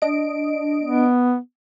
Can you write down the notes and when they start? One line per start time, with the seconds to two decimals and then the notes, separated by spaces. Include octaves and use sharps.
0.02 D4 D#5 D7
0.84 B3